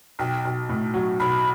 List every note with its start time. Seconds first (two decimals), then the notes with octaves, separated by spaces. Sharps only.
0.19 B1 G5
0.45 B1
0.69 A2
0.94 F#3
1.20 B1 B5